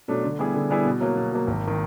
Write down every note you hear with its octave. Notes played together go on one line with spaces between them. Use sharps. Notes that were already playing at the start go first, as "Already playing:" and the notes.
B2 F#3 A3 D4
D3
G3 B3 E4 G#4
D3
G3 B3 E4 G#4
B2
F#3 A#3
B2
F#3 A#3
G#1
D#3